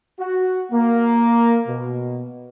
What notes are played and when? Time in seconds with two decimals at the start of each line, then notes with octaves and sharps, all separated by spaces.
0.20 F#4
0.72 A#3
1.68 B2